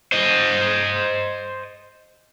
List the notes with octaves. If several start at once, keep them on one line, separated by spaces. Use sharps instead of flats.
C5 D#5